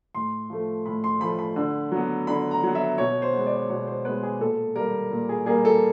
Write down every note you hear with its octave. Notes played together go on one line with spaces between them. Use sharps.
A2 C6
F3 A3
A2 B5
C6
F3 A3 B5
B5
D3
F#3 B3
D3 B5
A#5
F#3 B3
E5
B2 C#5
C5
G#3 B3
D5
B2 C#5
C5
G#3 B3 B4
G#4
A#2 A4
G3 A#3 A#4
A#2
G#4
G3 A#3 G#4
A4